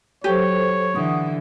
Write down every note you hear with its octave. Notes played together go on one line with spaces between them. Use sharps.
F#3 G4 A4 C5 C#5
D3 E3 F#5 C#6 D#6